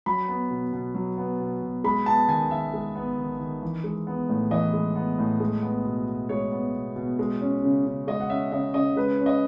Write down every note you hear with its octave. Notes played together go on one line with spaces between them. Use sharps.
F#3 B5
B3
B2
B2
F#3
B3
B2
B2
G#3 B5
B3 A5
D#3 G#5
D#3 E5
G#3
B3
D#3
D#3
E3
G#3
B3
A2
E3 D#5
G#3
B3
A2
G#3
B3
B2
B2
G#3 C#5
B3
B2
B2
G#3
C#4
C#3
C#3
G#3 D#5
F#5
C#4 E5
C#3 D#5
C#3 D#5
G#3 B4
C#4
D#5